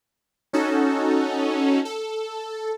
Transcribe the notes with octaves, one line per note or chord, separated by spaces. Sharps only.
C#4 D#4 F#4 A4
A4